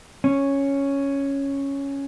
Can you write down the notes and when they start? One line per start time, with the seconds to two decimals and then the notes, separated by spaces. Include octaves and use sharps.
0.24 C#4